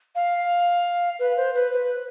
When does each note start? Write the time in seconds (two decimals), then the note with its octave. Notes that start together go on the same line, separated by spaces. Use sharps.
0.15 F5
1.19 B4
1.37 C5
1.54 B4
1.72 B4